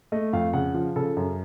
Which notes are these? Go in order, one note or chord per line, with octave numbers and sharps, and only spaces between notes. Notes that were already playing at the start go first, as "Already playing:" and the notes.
A3 D#5
F2 F5
C#3 F#5
F3
C#3 A4
F#2